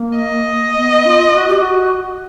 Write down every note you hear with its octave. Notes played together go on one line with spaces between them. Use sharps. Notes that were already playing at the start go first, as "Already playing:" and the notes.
Already playing: A#3
D#5
B3
F4
F#4
G4
F#4